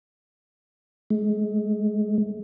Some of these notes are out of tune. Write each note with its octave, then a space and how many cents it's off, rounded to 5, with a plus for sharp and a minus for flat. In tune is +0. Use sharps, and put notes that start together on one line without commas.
G#3 +30